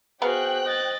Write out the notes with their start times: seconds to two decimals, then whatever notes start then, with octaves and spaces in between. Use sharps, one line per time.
0.22 B3 F#4 G#4 A#4 C5 F5 G5 F#6
0.65 D#5 A6